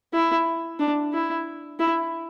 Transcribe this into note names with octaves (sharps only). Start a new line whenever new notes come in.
E4
D4
E4
E4